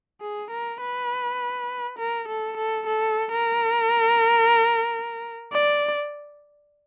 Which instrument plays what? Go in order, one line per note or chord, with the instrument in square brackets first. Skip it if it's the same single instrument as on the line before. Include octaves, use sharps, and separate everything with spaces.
[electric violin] G#4
A#4
B4
A#4
A4
A4
A4
A#4
D5